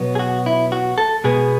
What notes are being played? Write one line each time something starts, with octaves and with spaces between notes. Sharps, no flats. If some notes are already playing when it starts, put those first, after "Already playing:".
Already playing: B2 F#3 B3
G#4
F#4
E4
F#4
A4
B2 G#3 B3 G#4